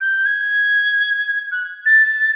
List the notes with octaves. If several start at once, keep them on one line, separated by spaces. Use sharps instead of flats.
G6
G#6
F#6
A6